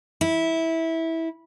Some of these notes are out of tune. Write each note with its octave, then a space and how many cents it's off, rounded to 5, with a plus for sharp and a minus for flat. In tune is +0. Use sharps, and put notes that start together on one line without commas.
E4 -15